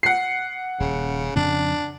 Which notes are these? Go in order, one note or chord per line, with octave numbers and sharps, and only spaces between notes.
F#5 C7
D#1 C#3
F2 C#3 C4 D4